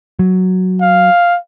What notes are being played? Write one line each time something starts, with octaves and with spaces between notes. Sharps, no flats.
F#3
F5